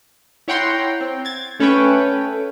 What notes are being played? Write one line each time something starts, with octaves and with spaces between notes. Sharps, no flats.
E4 C#5 F#5 G5 A#5 C6
C4
G#6 A6
A3 C#4 A4 B4 C#5 G5